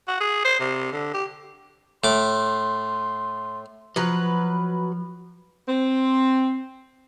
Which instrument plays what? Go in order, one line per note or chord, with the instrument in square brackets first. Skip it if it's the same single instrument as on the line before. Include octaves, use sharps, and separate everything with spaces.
[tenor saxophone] F#4
G#4
C5
C3
D3
G4
[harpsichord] A2 D6 [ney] C6
[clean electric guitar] F3 [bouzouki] F#3 B4
[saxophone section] C4